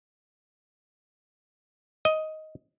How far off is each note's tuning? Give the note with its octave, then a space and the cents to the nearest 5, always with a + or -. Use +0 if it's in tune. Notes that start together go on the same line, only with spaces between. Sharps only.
D#5 +10